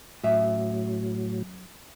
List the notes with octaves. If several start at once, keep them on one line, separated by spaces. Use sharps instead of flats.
F#2 A2 F#3 E5